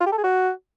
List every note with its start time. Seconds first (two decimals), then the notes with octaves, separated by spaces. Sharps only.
0.01 F4
0.06 G4
0.12 A4
0.18 G#4
0.24 F#4